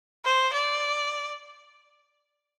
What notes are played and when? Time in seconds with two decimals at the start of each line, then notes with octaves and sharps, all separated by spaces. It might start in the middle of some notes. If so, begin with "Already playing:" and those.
0.25 C5
0.53 D5